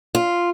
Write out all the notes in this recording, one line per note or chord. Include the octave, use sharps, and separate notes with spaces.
F4